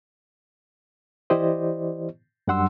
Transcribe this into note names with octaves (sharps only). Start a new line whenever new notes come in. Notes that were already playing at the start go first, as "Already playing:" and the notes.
E3 E4 G4 C5 D5 D#5
F#2 G3 D4 F#5 C6 E6